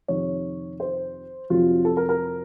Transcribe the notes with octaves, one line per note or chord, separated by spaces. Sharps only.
F2 C3 D#3 C#5
C5
F2 C3 F#3 F4
A4
A#4
A#4